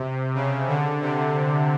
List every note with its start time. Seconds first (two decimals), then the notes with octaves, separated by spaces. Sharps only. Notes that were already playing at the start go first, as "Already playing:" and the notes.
Already playing: C3
0.35 C#3
0.68 D3
1.01 C3